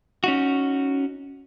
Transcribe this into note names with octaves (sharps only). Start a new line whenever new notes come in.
C#4 D#4 F#4